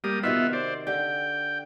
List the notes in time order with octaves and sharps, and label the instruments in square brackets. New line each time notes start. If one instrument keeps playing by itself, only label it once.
[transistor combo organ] G3 A#3 D#6 [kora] G4
[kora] C3 D#3 F#4 [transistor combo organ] B3 F4 E5
[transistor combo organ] C5 D5
[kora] D3 G4 [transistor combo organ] G5